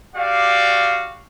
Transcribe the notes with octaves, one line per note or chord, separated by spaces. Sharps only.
F#4 G4 D5 F5